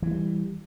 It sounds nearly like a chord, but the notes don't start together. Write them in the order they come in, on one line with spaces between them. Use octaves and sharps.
E3 G#3 G3